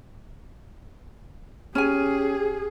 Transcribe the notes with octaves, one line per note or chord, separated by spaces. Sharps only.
C#4 G4 G#4 G#5